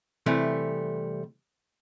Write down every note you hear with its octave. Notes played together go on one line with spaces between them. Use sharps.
C3 E3 G3 A3